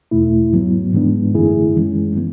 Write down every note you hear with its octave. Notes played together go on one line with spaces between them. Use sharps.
E2 B2 A3 E4
G#2 F#3 B3
G#2 E3 G#3 B3 D4
F#2 D3 A3 E4 G#4
F#2 E3 G#3 C#4
E3 B3